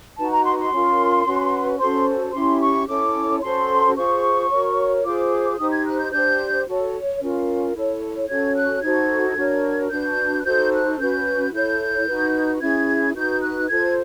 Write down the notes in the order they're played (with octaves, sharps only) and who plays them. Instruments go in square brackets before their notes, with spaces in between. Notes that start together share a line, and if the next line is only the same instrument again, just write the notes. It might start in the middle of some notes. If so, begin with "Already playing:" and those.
[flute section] D#4 F#4 B4 A5
A#5
C6
C6
C#4 F4 A#4
C#4 F#4 B4
C#4 F#4 A4 C5 C6
C#4 E4 G4 C6
C#6
C#4 E4 A4 C#5 D6
C#4 F#4 A4 C5 C6
F4 G#4 C5 C#6
F#4 A#4 C#5
F4 G#4 C5 D6
D#4 G4 C5 D#6
G#6
F#6
G6
D4 G4 C5 G6
F#4 A4 C#5
C#4 F4 A#4
E4 A4 C#5
C#4 F#4 A4 C#5 G#6
F#6
D#4 F#4 A4 C5 G#6
D4 F#4 A#4 C#5
D4 F#4 B4 G6
F#6
D#4 F#4 A4 C5 G6
F#6
C#4 F#4 B4 G6
E4 A4 C#5 G6
D#4 F#4 B4
C#4 E4 G#4 G#6
D#4 F#4 B4 G6
F#6
F4 A4 C5 G#6